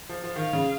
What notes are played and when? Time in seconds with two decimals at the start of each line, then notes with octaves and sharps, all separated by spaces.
0.09 F3
0.24 F3
0.36 D#3 F5
0.53 C#3